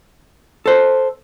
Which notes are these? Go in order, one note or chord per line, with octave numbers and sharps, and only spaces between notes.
A4 C5